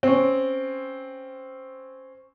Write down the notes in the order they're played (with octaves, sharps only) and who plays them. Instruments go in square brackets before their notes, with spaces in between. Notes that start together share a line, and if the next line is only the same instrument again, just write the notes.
[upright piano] C4 C#4